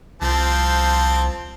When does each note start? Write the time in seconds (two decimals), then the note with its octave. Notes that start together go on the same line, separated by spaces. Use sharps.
0.22 C2 F3 C4 A5